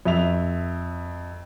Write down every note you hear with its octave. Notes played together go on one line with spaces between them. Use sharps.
F2 E5 F7